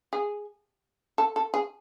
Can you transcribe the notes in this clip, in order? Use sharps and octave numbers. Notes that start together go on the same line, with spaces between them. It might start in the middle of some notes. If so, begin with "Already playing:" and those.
G#4
A4
A4
G#4